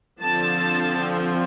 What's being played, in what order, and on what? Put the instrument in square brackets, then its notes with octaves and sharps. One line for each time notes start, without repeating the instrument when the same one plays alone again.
[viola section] D3 F3 C4 A5